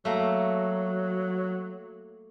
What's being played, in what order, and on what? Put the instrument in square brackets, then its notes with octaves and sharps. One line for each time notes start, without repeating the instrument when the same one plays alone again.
[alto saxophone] F#3 [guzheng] A3 A#3